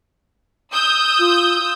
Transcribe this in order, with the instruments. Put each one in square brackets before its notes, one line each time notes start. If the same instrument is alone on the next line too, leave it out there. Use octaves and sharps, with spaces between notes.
[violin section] D#6 E6 G6
[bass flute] F4